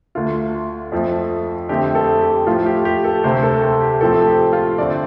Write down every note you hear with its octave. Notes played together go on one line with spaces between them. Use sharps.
D2 D3 A3 F4
F2 F3 A3
F2 D3 A3 C4 G4
A4
G4
A2 F3 A3 F4
G4
G4
A4
D2 C3 A3 C4 C5
A4
A4
G4
A2 F3 C4 A4
G4
F4
G2 D3 A3 C4 D5